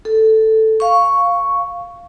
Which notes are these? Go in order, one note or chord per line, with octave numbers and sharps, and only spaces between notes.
A4
F5 C#6